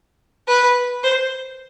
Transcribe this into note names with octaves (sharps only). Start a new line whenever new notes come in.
B4
C5